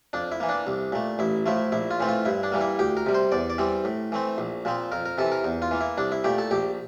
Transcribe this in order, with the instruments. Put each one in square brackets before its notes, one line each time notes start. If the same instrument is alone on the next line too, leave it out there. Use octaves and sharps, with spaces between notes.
[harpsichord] F2 D4
E4
E3 A#3
D4
C2
A#2 A3
A1 E4
A2 F3 A3 E4
A#1 E4
F4
A2 E3 A3 C4
F4
G2 E4
D4
E3 G3 A#3
E4
D2 G4
A#4
C3 G3
C5
E2 D5
D5
E3 G3 C4
A2
E3 A3 C4
A#1
A#2 F3 C4
F2 A#4
A#4
C3 E3 A4
A#4
E2
F4
E3 A#3
E4
C2 D4
E4
A#2 A3 G4
A4
A#1 G4